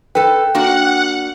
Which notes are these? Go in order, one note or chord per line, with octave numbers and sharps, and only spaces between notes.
A4 B4 G5
A#3 D4 F#4 F#5